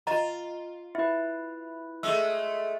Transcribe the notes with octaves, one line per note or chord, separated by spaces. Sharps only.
F4 D#5 A#5
E4 B4 E5
G#3 A3 E5 E6